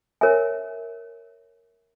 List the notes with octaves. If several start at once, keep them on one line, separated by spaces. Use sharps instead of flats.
A#4 C#5 E5 G#5